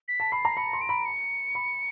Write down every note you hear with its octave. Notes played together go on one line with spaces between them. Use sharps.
B6
A5
B5 C7
A#5
B5 C#7
C6
D7
B5
C#7
B5